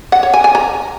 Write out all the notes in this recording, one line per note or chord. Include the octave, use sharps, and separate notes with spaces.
F#5
C#5
G#5
G#5
A#5